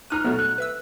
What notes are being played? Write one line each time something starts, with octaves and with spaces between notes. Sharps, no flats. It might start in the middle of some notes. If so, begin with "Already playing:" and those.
C#2 D#4 A#5 F6 F#6 D#7
B2 F#3 A3 B3 F#4
A4 F#6
B4 E5 E6